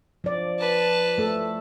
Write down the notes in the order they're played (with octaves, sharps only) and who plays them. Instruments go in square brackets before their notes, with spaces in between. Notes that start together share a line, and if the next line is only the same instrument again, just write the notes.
[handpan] F3 D5
[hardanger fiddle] B4 A5
[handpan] A3 A4